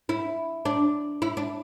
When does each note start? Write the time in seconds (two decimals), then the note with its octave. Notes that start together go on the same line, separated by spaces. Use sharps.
0.09 E4
0.65 D4
1.22 E4
1.37 D4